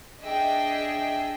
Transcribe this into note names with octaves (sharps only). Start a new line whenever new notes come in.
D4 G#4 D#5 E5 G5